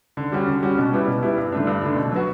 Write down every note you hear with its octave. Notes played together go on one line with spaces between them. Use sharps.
D3
G3 C#4 F#4
D3
G3 C#4 F#4
B2
G3 B3 E4
B2
G3 B3 E4
G2
D3 A3 D4
G2
D3 A3 D4
B2
F#3 B3 F#4